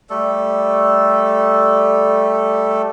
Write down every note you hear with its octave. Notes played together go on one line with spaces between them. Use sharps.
G3 A3 A4